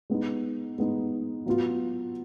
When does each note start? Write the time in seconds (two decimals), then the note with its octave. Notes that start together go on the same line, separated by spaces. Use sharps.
0.10 G#3 B3 D#4
0.78 G#3 B3 D#4
1.46 F#3 B3 F4